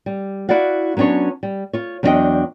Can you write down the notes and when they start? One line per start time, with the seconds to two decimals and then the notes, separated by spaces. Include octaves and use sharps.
0.06 G3
0.49 E4 F#4 D5 F5 F#5
0.97 F#3 B3 C#4 D4 C#5
1.43 G3
1.73 F4 C#5
2.03 E2 F#3 D4 A#4 D#5 G5